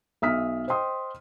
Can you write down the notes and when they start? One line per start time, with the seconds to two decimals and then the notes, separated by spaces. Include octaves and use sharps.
0.22 B1 E5 D#6 F6 B6
0.68 C5 D#5 G5 C6 D#6